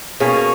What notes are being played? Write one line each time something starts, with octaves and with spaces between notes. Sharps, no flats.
B2 A#3 C#4 G#4